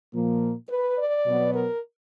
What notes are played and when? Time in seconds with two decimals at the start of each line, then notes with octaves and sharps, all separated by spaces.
0.14 A#2 F3 A#3
0.69 B4
0.98 D5
1.27 B2 F#3 B3
1.55 A#4